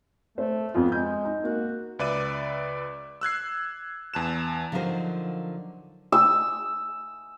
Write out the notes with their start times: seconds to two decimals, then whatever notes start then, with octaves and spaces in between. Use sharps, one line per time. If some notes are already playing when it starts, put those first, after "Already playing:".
0.38 A3 C5
0.74 F2 B3 F4
0.92 G#3 G6
1.25 D#4
1.44 A#3 F#4
1.99 C#2 B4 D5 E5 D6 D#7
3.21 E6 F#6 G#6 C7
4.14 E2 A5 F#6 E7
4.72 D3 F3 F#3 D#4 A#4 C5
6.12 E6